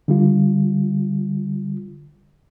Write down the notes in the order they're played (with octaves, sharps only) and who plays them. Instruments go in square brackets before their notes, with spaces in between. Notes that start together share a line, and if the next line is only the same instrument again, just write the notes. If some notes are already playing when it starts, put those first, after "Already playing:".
[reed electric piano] D3 G3 F4